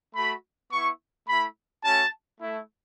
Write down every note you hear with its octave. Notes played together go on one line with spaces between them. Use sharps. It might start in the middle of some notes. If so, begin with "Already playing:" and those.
A3 F#4 B5
B3 E4 C#6
A3 E4 B5
A3 C#4 F#4 A5
A3 E4